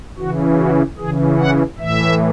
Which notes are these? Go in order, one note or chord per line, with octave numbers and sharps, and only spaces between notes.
C#3 E3 F#4
F#4
C#3 E3 G#4
F#5
A2 E3 E5